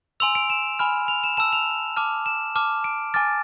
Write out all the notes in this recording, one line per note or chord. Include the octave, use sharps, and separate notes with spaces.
G#5 C6 E6 F7
D7
E7
G#5 B5 F6
F7
E7
A5 E6 E7
F7
A5 D6 F6
E7
A5 D6 F6
D7
G#5 D6 F6 A6